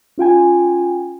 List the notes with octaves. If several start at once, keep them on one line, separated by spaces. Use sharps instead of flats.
C#4 F4 G5 G#5